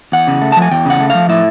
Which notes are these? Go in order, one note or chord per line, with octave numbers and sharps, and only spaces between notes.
E2 F#5
C#3
A3
A5
F3
G#5
E2 G5
C#3 F#5
A3
F3 F5
A2 E5